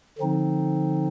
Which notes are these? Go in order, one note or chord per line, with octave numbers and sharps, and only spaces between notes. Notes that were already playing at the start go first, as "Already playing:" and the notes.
D3 F3 C4 D#4